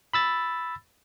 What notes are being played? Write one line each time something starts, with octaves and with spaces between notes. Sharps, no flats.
B5 E6 A6